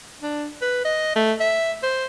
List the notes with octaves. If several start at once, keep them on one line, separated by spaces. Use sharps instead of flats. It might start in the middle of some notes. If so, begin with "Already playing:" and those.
D4
B4
D#5
A3
E5
C5